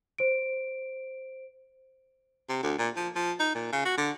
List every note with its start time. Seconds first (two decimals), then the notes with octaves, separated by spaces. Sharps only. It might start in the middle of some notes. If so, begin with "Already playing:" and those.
0.18 C5 D7
2.49 C3
2.63 D2
2.78 A#2
2.96 F3
3.15 F3
3.39 D#4
3.55 A#2
3.73 C#3
3.85 F#4
3.97 D3